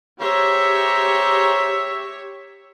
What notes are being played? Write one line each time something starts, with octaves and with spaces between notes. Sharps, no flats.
G4 G#4 C5 C#5 E5 A#5